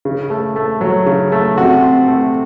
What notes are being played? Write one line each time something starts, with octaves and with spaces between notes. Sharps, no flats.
C#3
A3
A3
F#3
C#3
A3
C3 F#4
C4
A3